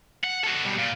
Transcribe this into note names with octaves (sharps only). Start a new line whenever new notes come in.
F#5
F#4 A4
B2 G3
A#2